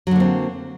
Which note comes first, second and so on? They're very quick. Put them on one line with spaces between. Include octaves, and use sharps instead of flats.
F#3 D3 A#3 C4